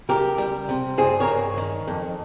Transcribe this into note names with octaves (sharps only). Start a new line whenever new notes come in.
C#2 G4 A#4
G3
C3
G2 G#4 C5
A#4 C#5
G2
D#3
F2